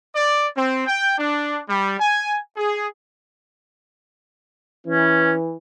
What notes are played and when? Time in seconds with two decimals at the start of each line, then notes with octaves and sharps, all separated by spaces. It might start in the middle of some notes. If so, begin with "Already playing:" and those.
0.15 D5
0.56 C4
0.87 G5
1.18 D4
1.68 G3
2.00 G#5
2.56 G#4
4.87 E3 C#4